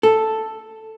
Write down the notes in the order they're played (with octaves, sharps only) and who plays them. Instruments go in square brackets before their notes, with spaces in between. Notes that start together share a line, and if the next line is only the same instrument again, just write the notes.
[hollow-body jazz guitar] A4